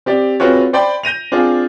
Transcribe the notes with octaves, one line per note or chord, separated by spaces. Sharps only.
C4 G4 D5
C4 F4 F#4 G#4 B4 C#5
C5 D5 G5 B5 C6
G6 A#6 D#7 F7
C4 D4 F4 G#4